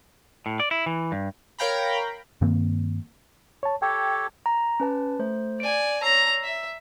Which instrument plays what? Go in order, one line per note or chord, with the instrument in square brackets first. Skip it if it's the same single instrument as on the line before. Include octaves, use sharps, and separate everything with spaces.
[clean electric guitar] A2
D5
E4
E3
G2
[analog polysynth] A#4 C#5 F5 G5 A#5 B5
[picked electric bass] G2 D#3 A#3 C4
[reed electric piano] C#5 A5
[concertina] G4 A4 C#5 [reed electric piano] G5
[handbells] A#5
C#4 B4 A5
A3 C5
[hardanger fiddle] D5 G#5 [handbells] D7
[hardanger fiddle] C#5 A#5 [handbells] E6 C7
[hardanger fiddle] E5